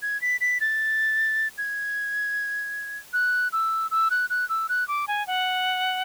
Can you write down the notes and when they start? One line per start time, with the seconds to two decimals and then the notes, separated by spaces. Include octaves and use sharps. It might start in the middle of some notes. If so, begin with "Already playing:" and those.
0.02 G#6
0.22 B6
0.41 B6
0.61 A6
1.58 G#6
3.13 F#6
3.53 E6
3.91 E6
4.11 F#6
4.30 F#6
4.49 E6
4.69 F#6
4.88 D6
5.08 G#5
5.27 F#5